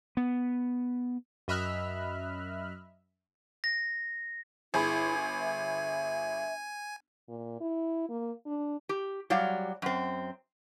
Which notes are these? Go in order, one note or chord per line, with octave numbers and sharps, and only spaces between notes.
B3
F#2 D#5 E5 B5 F6 F#6
A#6
G1 E4 G#4 G#5 B5
E5
A#2
E4
A#3
D4
G4
F#3 G3 D5 F5
F#2 C4